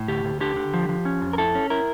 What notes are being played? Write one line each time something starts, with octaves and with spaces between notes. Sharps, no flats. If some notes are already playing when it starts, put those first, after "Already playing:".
Already playing: A2
D2 G4
D2
D3 G4
D3
F3
F3
C#4
F2
A#4
E4 A4
C#4
E4 A#4